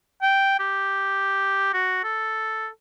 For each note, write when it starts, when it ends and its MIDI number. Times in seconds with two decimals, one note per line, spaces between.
0.22 0.58 79
0.59 1.71 67
1.73 2.01 66
2.04 2.68 69